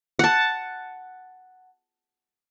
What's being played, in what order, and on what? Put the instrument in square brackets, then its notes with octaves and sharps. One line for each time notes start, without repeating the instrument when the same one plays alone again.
[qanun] F#5 A5